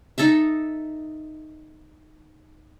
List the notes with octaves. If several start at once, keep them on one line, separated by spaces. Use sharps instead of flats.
D#4 A4 D#5 E5